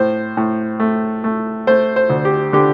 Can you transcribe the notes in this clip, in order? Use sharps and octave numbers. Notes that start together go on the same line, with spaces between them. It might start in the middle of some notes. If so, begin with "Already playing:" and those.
Already playing: A2 C5
A2
A3
A3
A3 C5
C5
D2
G4
D3 G4